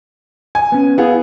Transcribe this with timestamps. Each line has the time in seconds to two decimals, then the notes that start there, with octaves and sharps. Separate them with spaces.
0.55 G#5
0.72 B3 C#4
0.98 B3 E4 G#4 F5